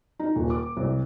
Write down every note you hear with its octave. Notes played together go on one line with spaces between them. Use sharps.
D#4
D#1
D6
C2